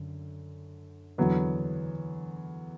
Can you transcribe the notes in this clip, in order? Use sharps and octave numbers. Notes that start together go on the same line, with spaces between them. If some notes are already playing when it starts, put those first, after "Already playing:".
Already playing: F#2 D3
E2 D3 F#3 B3